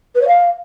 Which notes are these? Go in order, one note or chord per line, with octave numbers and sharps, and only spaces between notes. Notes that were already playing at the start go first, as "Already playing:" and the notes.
B4
C#5
F5